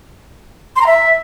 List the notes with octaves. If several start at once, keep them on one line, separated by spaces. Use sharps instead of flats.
C6
A#5
E5